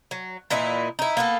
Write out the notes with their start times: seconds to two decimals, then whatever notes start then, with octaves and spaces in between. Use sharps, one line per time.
0.11 F#3
0.50 A#2 E3 D#4 E4
0.99 D#4 E4
1.17 A#3 B3 A4